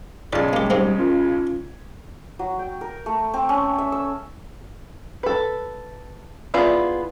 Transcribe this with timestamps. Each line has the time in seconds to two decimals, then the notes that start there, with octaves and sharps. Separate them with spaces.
0.33 B1 C#3 D5 A5
0.53 G#3 A#3 G4 G#5
0.70 G#2 G3 A#3 C4
0.98 C#4 F4 A#4
2.39 F#3
2.59 G5
2.81 A#4
3.06 A3
3.34 C4
3.49 C#4
3.78 E5
3.92 E6
5.23 A4 B4
6.54 B3 E4 F4 G#4 D5